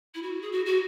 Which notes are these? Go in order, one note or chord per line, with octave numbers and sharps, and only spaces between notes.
E4
F#4
G#4
F#4
F#4